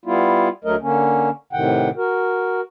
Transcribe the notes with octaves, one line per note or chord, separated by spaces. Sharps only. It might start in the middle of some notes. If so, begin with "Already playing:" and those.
G3 B3 E4 F4
D2 F#3 A3 A#4 D#5
D3 A#3 C#4
A2 C3 D#3 F#5 G5
F#4 A#4